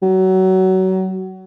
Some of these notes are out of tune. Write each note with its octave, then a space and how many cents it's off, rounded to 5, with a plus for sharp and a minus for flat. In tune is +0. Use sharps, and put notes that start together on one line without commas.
F#3 +25